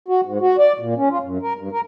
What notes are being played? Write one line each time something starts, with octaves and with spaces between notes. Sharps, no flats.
F#4
G#2
F#4
D5
A#2
C#4
F4
F#2
A#4
G2
A#4